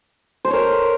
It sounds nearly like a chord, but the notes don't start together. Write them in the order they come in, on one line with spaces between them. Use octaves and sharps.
C5 A5 C#5 A#4